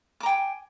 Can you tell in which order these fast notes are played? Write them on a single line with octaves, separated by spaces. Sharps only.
D6 A#5 G5 G#5